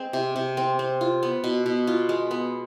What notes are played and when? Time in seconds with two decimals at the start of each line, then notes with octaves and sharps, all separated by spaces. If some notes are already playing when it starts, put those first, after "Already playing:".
Already playing: G#3 C4
0.13 C3
0.36 C3
0.57 C4
0.79 C4
1.01 F4
1.23 B3
1.44 B2
1.66 B2
1.87 F4
2.09 G#3
2.31 B3